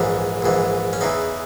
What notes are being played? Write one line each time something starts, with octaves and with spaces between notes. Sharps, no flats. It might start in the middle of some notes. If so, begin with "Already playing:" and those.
Already playing: A#1 G#2 E3 C#4
A#1 G#2 E3
C#4
E2 C#3 E3 D#4